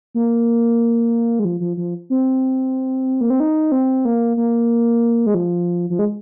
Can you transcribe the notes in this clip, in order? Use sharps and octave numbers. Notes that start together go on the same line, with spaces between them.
A#3
G#3
F3
F3
F3
C4
A#3
C4
D#4
C4
A#3
A#3
G#3
F3
F3
G#3